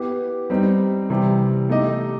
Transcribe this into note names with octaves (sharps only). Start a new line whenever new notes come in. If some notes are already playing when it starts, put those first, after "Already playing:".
Already playing: B3 E4 G4 B4
G3 C4 D#4
C3 E3 G3
A3 D#4 G4 D#5